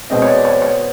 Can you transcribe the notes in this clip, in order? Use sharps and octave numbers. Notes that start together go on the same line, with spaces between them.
B2 G#3 C4 D#5
C#5
D5
C#5
C#5